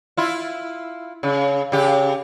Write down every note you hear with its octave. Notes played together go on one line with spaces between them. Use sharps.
E4 F4
C#3
C#3 G4